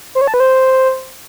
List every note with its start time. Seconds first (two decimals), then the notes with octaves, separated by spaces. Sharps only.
0.15 C5
0.21 C#5
0.27 A5
0.34 B4
0.40 C5